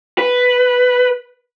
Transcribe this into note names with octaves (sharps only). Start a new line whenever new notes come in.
B4